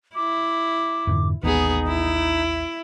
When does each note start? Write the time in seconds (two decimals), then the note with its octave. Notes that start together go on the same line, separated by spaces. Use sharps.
0.15 E4 D6
1.07 F2 G#2 D3
1.43 A1 D#2 B3 D#4 G#4
1.88 E4